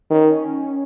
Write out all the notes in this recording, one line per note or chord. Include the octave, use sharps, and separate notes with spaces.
D#3 C#4
C#4